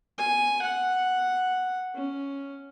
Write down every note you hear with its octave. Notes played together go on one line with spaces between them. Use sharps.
G#5
F#5
C#4